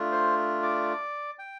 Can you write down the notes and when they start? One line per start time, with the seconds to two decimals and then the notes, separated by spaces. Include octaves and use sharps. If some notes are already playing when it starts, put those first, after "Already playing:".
Already playing: A3 D4 F4
0.12 C5
0.62 D5
1.39 G5